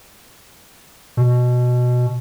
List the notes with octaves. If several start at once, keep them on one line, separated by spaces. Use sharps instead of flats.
B2